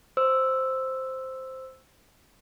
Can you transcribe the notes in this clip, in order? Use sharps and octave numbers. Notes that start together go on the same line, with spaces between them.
C5 E6